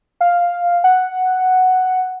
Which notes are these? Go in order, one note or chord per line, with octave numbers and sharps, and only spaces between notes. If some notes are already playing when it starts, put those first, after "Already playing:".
F5
F#5